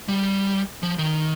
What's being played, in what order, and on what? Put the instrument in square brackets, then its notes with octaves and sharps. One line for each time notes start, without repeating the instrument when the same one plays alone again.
[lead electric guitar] G3
F3
D#3